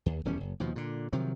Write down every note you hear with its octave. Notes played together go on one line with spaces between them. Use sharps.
D#2
D1 E2 G3 C#4
F#1
D#2 B2 F3
A#2 D3
C3 D#3 F3 F#3